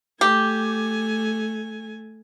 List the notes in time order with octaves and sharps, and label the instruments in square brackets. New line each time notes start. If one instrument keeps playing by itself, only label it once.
[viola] A3 G#5 [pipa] G4